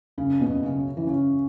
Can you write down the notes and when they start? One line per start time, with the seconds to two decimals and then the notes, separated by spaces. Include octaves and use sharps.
0.17 F#2 C#3
0.41 B2
0.47 F#2
0.63 C#3
0.78 C#4
0.97 E3
1.07 C#3 C#4